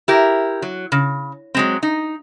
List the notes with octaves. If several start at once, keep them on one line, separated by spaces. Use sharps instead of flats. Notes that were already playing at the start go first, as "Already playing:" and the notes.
E4 G4 A#4
F#3
C#3
F#3 G#3 C4
D#4